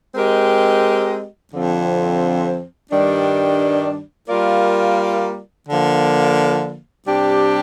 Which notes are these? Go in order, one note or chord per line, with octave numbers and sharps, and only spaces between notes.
G#3 C4 G4 A#4 D#5
F2 D3 F3 C4
G2 D#3 G3 D4
G3 A#3 F4 A#4 D5
D3 F3 A#3
C3 G3 D4 G4